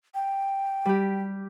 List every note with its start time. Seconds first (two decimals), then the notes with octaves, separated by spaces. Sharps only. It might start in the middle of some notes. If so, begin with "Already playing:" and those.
0.15 G5
0.85 G3 G4